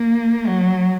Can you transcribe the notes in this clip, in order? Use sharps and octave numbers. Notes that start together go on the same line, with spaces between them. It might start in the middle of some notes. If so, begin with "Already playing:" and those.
Already playing: A#3
F#3